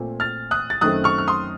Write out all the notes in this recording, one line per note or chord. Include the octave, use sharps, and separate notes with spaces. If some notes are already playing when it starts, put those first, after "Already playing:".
Already playing: A#2 A3 C4
F6 A6
D#6 F#6
A6
F#2 D#3 A3 C4 D#6 F#6
C#6 F6
F6
C6 D#6